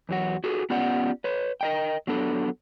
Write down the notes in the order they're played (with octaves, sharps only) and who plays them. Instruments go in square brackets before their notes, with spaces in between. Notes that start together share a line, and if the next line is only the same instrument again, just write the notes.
[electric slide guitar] E2 F#3 F#4
F#4 G#4 A4
B3 C#4 F4 G4 D5 F#5
B4 C#5
A#4 D#5 G5
F#3 B3 D4 A4